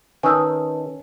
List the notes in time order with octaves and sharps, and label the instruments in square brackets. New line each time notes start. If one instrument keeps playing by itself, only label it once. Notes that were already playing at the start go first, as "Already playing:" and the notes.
[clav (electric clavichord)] D#3 [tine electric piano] C#4 [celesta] B4 A5 [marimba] G#5 E6